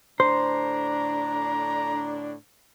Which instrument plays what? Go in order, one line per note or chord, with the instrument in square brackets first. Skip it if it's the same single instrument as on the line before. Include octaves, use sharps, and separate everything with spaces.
[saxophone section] A2 D3 D4 [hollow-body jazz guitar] C5 [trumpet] A#5